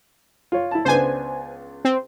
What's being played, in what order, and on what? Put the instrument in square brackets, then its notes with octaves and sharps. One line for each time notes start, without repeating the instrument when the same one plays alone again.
[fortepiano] F4 C#5
E4 A5
[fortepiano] C#2 B3 D4 [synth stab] C5 G#5
[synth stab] C4